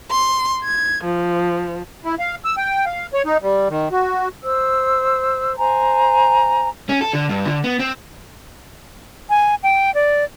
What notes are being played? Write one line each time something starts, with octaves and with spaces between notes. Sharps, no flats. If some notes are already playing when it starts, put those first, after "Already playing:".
C6
G#6
F3
E4
F5
E6
G5
F5
C#5
D#4
G3
D#3
F#4
C5 E6
C5 G#5 A#5
C#4
A4
D3
G2
D3
B3
C4
G#5
G5
D5